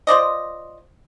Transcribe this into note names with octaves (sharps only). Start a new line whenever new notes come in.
F4 C5 D5 D#5